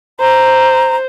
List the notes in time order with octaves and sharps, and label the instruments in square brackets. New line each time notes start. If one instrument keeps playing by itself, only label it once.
[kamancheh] C5 [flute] A#5